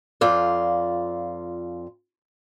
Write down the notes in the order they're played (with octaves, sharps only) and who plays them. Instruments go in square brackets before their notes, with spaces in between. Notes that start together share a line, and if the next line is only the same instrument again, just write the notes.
[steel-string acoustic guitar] F2 F4 D5